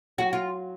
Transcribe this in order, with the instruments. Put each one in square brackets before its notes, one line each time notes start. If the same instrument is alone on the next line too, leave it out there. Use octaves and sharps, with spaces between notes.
[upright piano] F#3 [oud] F#4
[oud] F4